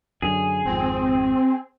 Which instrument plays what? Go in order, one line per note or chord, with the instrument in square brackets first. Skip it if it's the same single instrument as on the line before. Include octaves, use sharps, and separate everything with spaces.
[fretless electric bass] F#2 D3 [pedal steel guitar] G#4
[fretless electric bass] G#1 F2 [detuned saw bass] C4